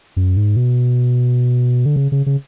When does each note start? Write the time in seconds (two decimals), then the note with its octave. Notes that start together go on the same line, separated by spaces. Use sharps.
0.16 F#2
0.37 G#2
0.56 B2
1.86 D3
1.96 C#3
2.12 C#3
2.26 C#3